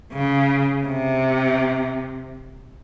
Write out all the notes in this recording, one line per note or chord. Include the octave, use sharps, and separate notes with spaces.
C#3
C3